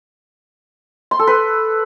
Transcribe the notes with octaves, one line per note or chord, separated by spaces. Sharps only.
C6
A4
B4